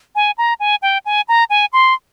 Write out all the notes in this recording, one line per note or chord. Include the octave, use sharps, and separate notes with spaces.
G#5
A#5
G#5
G5
G#5
A#5
G#5
C6